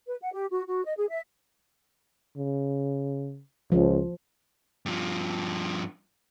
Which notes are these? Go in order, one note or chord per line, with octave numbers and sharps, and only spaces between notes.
B4
F#5
G4
F#4
F#4
D#5
G#4
E5
C#3
C#2 F3
G2 F3